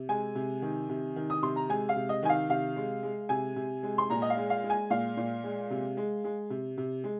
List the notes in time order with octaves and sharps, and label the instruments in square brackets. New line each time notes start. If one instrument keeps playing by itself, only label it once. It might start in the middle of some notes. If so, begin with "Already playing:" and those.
Already playing: [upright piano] C3
G#3 G#5
C3
D#3
C3
D#3
D#6
C3 C6
A#5
G#3 G#5
F5
C3
D#5
D#3 G#5
F5
C3 F5
G#3
G#3
C3 G#5
C3
G#3
C6
A#2 A#5
D#5
F5
G#3
F5
G#3
G#5
A#2 F5
A#2
G#3
C3
G#3
G#3
C3
C3
G#3